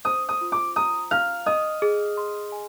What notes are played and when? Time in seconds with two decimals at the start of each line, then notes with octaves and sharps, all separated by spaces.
0.05 C5 D#6
0.29 D#6
0.41 F4
0.52 D6
0.76 A#5 D#6
1.11 F5 F6
1.46 D#5 D#6
1.82 G#4
2.17 C6
2.52 G#5